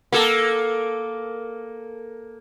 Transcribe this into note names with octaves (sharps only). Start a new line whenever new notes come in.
A#3 A4